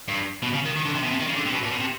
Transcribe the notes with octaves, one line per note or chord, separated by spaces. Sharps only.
G2
B2
C#3
D#3
D#3
D3
C3
B2
C3
D#3
C#3
D3
C3
B2
A#2
B2
C3